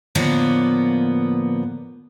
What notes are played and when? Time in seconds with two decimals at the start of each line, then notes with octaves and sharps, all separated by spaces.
0.15 A2 D3 F3 A#3 B3